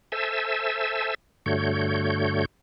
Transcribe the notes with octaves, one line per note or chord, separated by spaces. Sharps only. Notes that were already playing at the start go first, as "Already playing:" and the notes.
A4 C5 E5 G#5 A5 E6
G2 D3 A3 F#4 C#5 G6